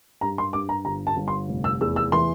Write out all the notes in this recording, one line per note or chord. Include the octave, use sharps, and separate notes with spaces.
G2 A#5
C6
G2 D6
A#5
G1 A#5
A5
G1
C6
F1
E6
E2 E6
E6
E3 C6